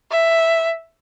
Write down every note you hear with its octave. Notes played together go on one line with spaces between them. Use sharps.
E5